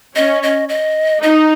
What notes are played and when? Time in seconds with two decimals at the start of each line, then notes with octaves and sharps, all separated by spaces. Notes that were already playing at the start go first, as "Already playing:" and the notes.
0.16 C#4 D#5
0.43 D#5
0.69 D#5
1.23 D#4 D#5